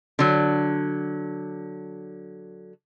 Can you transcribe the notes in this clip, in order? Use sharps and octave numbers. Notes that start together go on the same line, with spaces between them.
D3 F#3